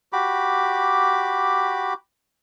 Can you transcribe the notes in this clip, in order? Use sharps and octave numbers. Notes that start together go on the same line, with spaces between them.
F#4 G4 B5 D6